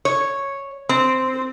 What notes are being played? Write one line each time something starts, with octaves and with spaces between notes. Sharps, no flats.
C#5
C4